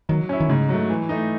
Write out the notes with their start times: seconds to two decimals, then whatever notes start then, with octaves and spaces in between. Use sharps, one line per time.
0.09 D#3 F#3
0.29 C#4 E4
0.40 D#3
0.49 G#2 C#3
0.69 F#3 A3
0.90 E3
1.09 A3 D#4